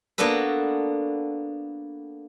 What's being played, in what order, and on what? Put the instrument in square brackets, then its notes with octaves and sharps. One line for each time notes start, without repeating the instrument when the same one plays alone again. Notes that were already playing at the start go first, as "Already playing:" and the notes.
[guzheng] A#3 B3 D4 F#4 A4 B4